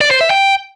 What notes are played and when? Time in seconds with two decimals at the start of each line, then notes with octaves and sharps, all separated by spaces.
0.01 D5
0.11 C5
0.21 E5
0.30 G5